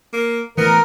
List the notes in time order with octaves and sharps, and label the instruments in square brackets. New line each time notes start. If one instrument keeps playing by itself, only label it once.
[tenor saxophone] A#3
[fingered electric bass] E3 A3 [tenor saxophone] B3 [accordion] A#4